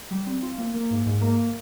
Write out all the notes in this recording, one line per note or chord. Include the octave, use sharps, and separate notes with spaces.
G3
C4
F4
A#3
A#3
G#2
G#2
A#3